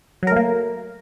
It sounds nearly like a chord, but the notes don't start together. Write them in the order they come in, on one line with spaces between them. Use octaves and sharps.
F#3 A#4 A3 A#3